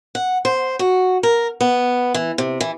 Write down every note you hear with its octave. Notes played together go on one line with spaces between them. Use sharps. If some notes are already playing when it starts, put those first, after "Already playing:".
F#5
C5
F#4
A#4
B3
E3
C3
E3